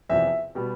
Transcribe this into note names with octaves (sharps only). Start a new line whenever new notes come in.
E2 C3 F3 E5
B2 G3 B3